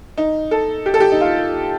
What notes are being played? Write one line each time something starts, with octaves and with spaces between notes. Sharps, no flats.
D#4
A4
G4
A4
G4
D#4
F4